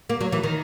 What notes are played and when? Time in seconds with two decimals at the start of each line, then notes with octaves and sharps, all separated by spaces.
0.09 A#3
0.21 F#3
0.33 E3
0.44 D#3